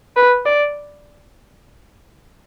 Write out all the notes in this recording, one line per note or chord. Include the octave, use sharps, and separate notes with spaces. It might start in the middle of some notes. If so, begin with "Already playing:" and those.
B4
D5